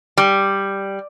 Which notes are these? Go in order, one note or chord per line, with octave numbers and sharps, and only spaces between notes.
G3